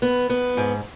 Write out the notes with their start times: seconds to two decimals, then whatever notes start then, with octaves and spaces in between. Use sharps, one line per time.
0.02 B3
0.30 B3
0.57 G#2